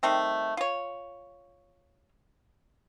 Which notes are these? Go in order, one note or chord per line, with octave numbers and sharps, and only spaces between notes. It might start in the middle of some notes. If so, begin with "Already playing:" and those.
D#3 G3 A3 C4
F4 C#5